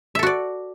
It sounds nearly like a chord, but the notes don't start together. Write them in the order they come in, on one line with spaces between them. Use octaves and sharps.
E5 A4 F#4 D5